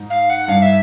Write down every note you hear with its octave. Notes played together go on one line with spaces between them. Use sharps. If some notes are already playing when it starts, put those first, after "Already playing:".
Already playing: G#2
F5
F#5
G2 F5
E5